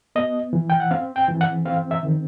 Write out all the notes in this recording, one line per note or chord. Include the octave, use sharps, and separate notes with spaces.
B3 D#5
E3
G5
F#5
C4 F5
G5
E3
F#5
C4 F5
E5
D#3